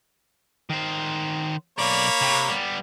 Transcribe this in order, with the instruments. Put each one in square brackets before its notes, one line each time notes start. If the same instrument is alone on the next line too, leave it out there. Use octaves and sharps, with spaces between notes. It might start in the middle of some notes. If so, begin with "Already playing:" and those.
[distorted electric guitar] D#3 C5
[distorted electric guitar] B1 D5 [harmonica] A#3 C#5 B5
[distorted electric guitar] C3
G3 B3